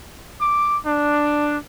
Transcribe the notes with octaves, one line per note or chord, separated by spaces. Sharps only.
D6
D4